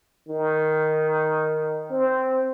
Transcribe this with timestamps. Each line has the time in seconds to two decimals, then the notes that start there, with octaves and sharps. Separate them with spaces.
0.28 D#3
1.91 C4